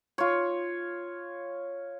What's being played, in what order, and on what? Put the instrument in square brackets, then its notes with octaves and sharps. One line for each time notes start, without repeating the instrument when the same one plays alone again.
[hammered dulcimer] F4 C#5